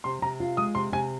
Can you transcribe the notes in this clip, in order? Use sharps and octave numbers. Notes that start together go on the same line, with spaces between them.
C3 C6
C3 A#5
F4
G#3 D#6
C3 C6
C3 G#5